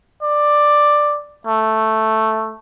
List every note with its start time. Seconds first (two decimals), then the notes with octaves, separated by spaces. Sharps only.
0.22 D5
1.47 A3